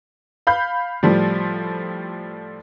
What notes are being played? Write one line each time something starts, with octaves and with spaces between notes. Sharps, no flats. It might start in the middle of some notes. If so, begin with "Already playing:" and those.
F5 B5 G6
A2 F3 G3